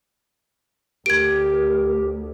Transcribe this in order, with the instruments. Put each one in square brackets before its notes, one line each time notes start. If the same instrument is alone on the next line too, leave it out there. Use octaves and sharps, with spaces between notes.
[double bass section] D2 [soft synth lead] G4 [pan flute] A#4 [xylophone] G#6 D7